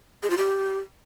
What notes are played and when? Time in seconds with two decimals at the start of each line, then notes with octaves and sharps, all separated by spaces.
0.23 G#4
0.30 F4
0.38 G4